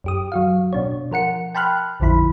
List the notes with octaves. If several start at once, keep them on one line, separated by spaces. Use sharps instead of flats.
F#2 G4 D#6
F#3 F#4 F5
B2 D4 C#5
F3 A#4 F#5 C#7
G5 A5 B5 C6 F6 F#6
A#1 F2 D3 F3 E4 B5